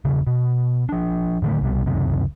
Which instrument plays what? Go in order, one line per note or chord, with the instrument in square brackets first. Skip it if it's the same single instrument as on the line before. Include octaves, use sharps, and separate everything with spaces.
[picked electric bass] E1 C#3
B2
F3 D4
A2 D3 D#3 A3
C2 B2 G3
C#2 F#2 C3 D#3